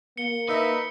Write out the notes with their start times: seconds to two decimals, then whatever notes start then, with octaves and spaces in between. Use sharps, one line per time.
0.17 A#3 C#7 G7
0.49 D#4 B4 D#5 E5